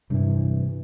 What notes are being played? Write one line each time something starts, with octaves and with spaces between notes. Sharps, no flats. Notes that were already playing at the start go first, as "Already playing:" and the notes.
G2 C3 E3